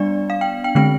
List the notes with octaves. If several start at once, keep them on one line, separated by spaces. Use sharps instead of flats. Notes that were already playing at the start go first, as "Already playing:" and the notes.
Already playing: G3 B3 D4 D5
F5
G5
G5
D3 G#3 C4 G5